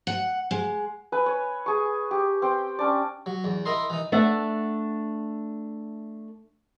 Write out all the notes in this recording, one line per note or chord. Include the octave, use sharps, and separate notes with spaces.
F#5
G#3
B4 G#5 E6
C#5
G#4 C#6
G4
C4 G5
C#4 D4 D5
F#3
E2
E4 A#4 D#5 C6
E3 D#4
A3 D4 E5 F#5